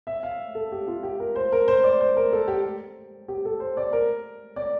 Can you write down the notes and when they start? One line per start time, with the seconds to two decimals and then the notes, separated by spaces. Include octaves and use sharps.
0.07 E5
0.23 F5
0.55 A4
0.72 G4
0.88 F4
1.03 G4
1.20 A#4
1.36 C5
1.52 A#4
1.68 C5
1.84 D5
2.01 C5
2.17 A#4
2.33 A4
2.48 G4
3.28 G4
3.45 A4
3.60 C5
3.77 D5
3.93 A#4
4.56 D5